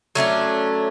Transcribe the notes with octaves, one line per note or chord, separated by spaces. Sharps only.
F#3 A3 C#4 D4